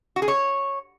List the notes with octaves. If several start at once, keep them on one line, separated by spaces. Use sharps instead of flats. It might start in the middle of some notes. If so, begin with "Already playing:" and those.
F#4
G#4
C#5